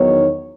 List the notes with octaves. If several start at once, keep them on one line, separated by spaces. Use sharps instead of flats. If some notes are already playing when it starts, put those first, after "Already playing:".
Already playing: E2 D#3 F#3 B3 D#4 C#5